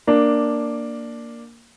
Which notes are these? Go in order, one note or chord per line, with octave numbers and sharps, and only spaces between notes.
A#3 D4